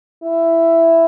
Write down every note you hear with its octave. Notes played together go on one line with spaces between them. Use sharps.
E4